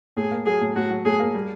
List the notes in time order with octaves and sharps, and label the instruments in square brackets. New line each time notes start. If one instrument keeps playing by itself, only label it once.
[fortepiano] A2 [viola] G#4
[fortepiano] A#3
[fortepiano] F#3 [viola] G#4
[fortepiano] A2
[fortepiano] A2 [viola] F#4
[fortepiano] F#3
[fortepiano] A2 [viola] G#4
[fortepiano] A#3
G3